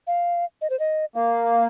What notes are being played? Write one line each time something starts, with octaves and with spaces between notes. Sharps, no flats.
F5
D#5
C5
D#5
A#3 F5